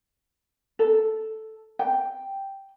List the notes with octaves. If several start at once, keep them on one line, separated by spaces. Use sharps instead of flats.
A4
G5